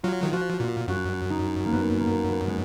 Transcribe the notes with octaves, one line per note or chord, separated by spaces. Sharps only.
F#3 F4
D#3
F3 F#4
A#2 F4
F#2 F#4
D#4
A#3
B3
A#3
B3
G#3